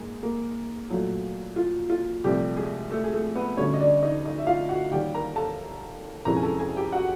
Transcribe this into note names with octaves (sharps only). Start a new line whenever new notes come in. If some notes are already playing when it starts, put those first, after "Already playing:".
Already playing: G#2 G#3 A#3 G#4
A#3 A#4
A#2 F#3 A3
F4
F4
C2 C3 F3 G3 A3 G4
G#3 G#4
A3 A4
G#4
A3 A4
B3 B4
D2 D3 G3 C#4 C#5
D#5
D4 D5
D#4 D#5
D#4 D#5
E5
F4 F5
F#4 F#5
D#2 D#3 G3 G4 G5
A#4 A#5
A4 A5
F2 C3 E3 G#3 C#4 A#4 A#5
G#5
A4 A5
G#4 G#5
G4 G5
F#4 F#5